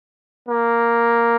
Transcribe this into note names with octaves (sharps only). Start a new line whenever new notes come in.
A#3